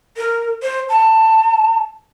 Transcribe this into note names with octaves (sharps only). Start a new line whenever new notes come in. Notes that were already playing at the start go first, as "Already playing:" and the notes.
A#4
C5
A5